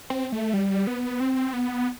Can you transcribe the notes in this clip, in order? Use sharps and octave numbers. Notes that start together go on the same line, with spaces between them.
C4
A3
G3
B3
C4
B3